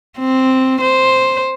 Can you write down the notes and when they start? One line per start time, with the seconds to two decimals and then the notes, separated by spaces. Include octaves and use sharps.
0.18 C4
0.81 C5